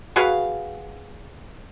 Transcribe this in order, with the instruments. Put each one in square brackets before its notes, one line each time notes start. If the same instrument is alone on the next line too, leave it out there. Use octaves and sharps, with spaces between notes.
[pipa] F#4 G#4 B4 F5